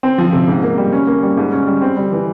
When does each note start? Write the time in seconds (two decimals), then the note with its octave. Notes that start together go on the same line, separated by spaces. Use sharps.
0.03 C4
0.18 F3
0.33 C3
0.48 G#2
0.63 A#3
0.78 G3
0.93 C#4
1.07 A#3
1.23 G3
1.37 G#2
1.52 C#4
1.67 G3
1.82 C4
1.97 G3
2.12 E3